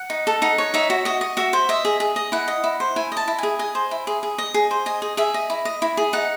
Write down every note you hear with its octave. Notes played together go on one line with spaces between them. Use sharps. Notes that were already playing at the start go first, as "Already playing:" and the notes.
Already playing: F#5
D#4
A4
D#4 F#5
C#5
D#4 E5
F#4
F#4 D#5
D#5
F#4 E5
C5
D#5 E5
G#4
G#4
D#5
E4 F#5
D#5
E4
C5
E4 G#5
D#5 A5
E4
G#4 G#5
D#5 G#5
C5
E4
G#4
G#4
D#5
G#4
C5
D#5 G#5
G#4
G#4 E5
D#5
E4
D#5
E4
G#4
D#4 F#5